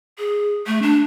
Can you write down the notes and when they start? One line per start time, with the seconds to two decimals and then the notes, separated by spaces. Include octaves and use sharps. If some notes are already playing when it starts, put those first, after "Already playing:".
0.19 G#4
0.67 A3
0.82 D4